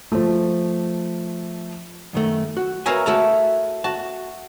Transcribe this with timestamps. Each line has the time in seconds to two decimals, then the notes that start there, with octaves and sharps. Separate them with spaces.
0.12 F3 A3
2.13 F#2 D#3 A3
2.57 F#4
2.86 A#4 B4 C#5 E5 F5 G#5
3.06 A3 E4 F#4 G#4 A5 A#5
3.84 F#4 A5